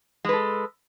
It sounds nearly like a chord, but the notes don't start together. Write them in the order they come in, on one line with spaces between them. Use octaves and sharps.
G#3 B4 A4